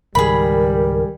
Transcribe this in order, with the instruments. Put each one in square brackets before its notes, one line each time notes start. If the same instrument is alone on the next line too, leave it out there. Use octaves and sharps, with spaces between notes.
[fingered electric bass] C#2 G#2 D#3 [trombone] G3 [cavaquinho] G#4 B5 [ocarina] A#4